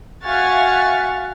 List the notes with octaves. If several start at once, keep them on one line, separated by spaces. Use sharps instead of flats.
F#4 E5 F5 G#5 C#6 F6 F#6 A6